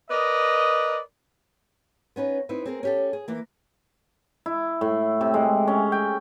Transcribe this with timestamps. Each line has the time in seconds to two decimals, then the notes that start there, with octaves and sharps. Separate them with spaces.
0.10 A#4 B4 D5 D#5
2.16 B3 C#4 D#4 B4
2.49 C4 D#4 E4 B4
2.66 C4 G#4 A#4
2.83 C#4 G4 A4
3.13 G#4
3.28 E3 A#3
4.46 E4
4.81 A2
5.21 C3
5.34 G#3
5.67 C#4
5.92 G5